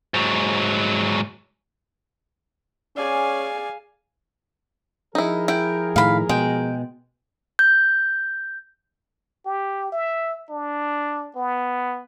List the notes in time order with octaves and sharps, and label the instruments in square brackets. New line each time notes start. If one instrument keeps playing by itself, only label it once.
[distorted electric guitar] G#2 F#3
[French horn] C#4 [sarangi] G#4 [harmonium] D5 [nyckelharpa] F5 G#5
[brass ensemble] F3 G#4 A#4 [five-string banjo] D#4 E4
[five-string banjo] E4 [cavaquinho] G5
[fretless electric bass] A2 D#3 [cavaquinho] F5 B5
[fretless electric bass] B2 [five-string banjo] G#3 [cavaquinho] G5
[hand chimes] G6
[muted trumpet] G4
E5
D4
B3